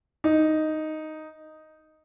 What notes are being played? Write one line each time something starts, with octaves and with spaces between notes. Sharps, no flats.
D#4